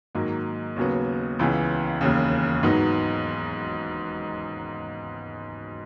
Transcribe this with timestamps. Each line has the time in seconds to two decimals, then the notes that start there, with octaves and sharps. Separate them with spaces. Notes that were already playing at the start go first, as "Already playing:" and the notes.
0.15 G#2 D#3 F#3 A#3
0.76 D#2 C#3 F#3 B3
1.39 C#2 C#3 E3 B3
2.01 E1 D#2 C#3
2.63 G#2 F#3 B3 D#4